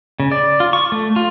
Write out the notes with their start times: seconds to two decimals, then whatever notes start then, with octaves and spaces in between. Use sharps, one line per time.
0.20 C#3
0.32 D5
0.60 F4
0.73 C#6
0.92 A3
1.16 F4